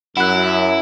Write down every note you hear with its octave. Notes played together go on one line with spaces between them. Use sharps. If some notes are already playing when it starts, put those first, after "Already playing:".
F#2 E4 F#5 F#6